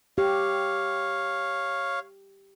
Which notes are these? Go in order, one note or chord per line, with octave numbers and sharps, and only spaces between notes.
G4 C#5 F5